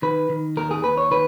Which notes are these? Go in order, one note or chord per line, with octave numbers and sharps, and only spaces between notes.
D#3 B4
D#3
D#2 A#4
G#4
D#2 B4
C#5
D#3 B4